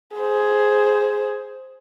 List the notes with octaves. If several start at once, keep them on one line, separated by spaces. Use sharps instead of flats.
G#4 C5